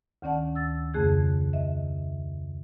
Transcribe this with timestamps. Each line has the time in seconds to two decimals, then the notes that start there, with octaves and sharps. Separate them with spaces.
0.22 D2 D#3 C#4 D5 F#5 A5
0.55 E6 A6
0.94 F2 C#3 A3 G#4 F#6 G#6
1.53 D#5 E5